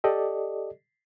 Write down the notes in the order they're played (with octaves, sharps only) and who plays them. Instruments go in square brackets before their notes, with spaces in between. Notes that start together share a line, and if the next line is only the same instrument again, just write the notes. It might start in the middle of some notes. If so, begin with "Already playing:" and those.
[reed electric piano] G4 A4 D5 D#5